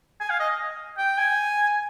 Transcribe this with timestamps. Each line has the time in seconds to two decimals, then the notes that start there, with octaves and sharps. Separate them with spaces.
0.20 G#5
0.30 F5
0.40 D#5
0.98 G5
1.18 G#5